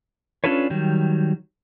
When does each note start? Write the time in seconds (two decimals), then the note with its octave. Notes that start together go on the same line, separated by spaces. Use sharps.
0.44 C#4 D4 F4 A4 B4 C#5
0.70 D#3 F#3 G3